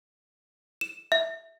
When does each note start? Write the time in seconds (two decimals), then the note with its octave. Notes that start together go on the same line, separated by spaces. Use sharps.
0.81 E7
1.12 E5